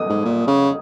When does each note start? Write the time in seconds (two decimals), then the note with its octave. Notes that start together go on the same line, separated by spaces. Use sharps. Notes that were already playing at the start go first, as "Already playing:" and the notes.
Already playing: D#6
0.10 G#2
0.25 A#2
0.47 C#3